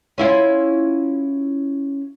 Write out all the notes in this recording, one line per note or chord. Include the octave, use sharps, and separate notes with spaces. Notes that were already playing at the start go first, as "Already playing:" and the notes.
C#4 E4 F4